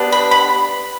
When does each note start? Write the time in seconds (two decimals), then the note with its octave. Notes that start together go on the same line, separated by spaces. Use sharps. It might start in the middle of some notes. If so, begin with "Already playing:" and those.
Already playing: B3 D4 G4
0.12 B5
0.31 B5